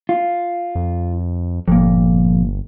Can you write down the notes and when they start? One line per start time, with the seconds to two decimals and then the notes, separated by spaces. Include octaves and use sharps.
0.09 F4
0.75 F2
1.68 G1 F2 A#2